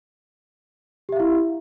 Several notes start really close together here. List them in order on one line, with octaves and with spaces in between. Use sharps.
G4 E5 F5 E4